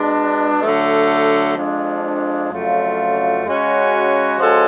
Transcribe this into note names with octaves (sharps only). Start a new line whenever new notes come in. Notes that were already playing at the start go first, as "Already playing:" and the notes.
Already playing: B2 G#3 D4
D3 F#3 A3
F2 F3 G#3 D4
F2 C#3 F#3 A3 F4
C#3 G#3 C#4 F#4
F3 G#3 C#4 F#4 A4